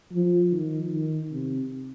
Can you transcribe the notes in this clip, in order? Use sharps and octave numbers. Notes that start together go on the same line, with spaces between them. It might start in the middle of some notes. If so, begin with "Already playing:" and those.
F3
D#3
D#3
C3